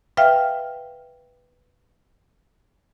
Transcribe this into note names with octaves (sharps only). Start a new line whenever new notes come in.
B4 E5 F5 G5 F6